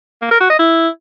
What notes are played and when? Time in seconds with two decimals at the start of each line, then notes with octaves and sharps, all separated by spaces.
0.22 A#3
0.31 A#4
0.40 F#4
0.50 D#5
0.59 E4